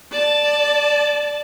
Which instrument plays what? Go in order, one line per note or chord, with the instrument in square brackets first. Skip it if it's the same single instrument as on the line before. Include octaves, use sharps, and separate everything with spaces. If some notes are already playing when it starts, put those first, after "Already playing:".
[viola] D5 A5